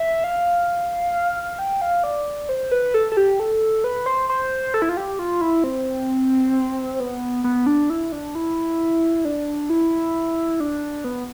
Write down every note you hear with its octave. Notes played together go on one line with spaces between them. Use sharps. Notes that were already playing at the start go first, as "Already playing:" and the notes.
Already playing: E5
F5
G5
F5
D5
C5
B4
A4
A4
G4
A4
B4
C5
C5
A4
E4
F4
G4
F4
E4
C4
B3
B3
D4
E4
D4
E4
D4
E4
D4
B3